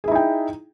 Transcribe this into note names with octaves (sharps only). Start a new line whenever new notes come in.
D#4 E4 G#4 G5